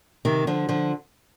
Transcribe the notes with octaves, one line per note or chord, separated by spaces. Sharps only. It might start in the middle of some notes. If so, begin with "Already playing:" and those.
C3 D#3
D3 F3
D3 F3